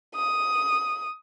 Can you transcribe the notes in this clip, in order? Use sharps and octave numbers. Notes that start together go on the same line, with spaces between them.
D#6